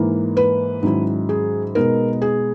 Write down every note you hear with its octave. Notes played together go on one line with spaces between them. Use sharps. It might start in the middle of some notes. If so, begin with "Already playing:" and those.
Already playing: G#2 E3 A#3
B4
G#2 D#3 F#3 C#4 E4
G#4
B2 G#3 B3 D#4 A#4
G#4